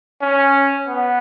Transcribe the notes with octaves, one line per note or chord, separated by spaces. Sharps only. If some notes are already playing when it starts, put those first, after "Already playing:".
C#4
B3